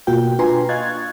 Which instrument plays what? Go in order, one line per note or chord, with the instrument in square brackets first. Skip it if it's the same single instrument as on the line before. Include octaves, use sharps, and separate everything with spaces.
[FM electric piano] B2 A#3 F4 F#4 G5
D4 F4 B4 G#5 A#5 C6
D#5 F5 C#6 F#6 G#6 A6